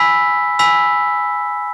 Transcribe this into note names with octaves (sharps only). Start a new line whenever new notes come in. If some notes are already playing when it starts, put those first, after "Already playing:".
Already playing: G#5 B5 E6 B6
G#5 B5 E6 B6